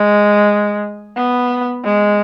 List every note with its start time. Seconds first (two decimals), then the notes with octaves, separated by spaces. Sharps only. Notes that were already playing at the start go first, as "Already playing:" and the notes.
Already playing: G#3
1.17 B3
1.84 G#3